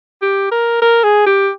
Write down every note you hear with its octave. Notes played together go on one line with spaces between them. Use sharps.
G4
A#4
A#4
G#4
G4